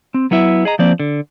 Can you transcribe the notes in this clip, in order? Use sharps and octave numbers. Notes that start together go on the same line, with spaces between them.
C4
F#3 B3 E4 E5
G#4 D#5 A#5
F3 A#3 C4 D5
D3